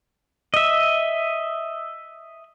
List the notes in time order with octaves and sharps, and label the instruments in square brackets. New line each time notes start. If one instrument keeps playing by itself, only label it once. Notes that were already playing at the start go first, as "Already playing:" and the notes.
[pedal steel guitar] D#5 E5